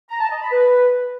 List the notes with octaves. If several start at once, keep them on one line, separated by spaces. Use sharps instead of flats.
A#5
A5
D#5
B5
B4